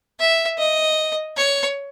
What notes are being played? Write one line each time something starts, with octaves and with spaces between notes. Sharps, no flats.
E5
D#5
C#5